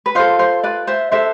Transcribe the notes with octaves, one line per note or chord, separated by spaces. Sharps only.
B4
F4 A4 C5
C5
B4 D5
C5 E5
D4 A4 C5 E5